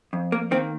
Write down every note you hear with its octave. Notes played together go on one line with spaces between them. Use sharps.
F2
A#3
D#3 A#3 C4